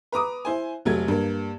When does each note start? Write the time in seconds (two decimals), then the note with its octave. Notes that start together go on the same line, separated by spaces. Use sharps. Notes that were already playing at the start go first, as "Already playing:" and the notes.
0.12 B4 A#5 D6 D#6
0.45 E4 C5 G#5
0.85 F1 F#3 A3 G#6
1.08 G2 A#3